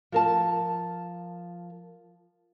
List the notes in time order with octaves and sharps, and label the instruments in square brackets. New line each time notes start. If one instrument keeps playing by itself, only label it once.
[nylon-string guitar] F3 A#4 A5